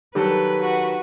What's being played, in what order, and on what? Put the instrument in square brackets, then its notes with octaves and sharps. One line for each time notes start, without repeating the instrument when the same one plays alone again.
[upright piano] D#3 F#3 A4 [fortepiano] G3 [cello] B4
[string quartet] F#4